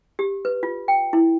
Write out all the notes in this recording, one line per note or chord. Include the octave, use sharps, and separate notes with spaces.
G4
B4
F4
G5
E4